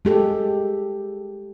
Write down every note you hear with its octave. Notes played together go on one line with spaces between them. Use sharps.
G#3 G4 A4